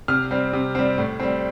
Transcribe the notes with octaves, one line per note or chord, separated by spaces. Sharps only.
C3 F6
G3 C4
C3
G3 C4
A2
G3 C4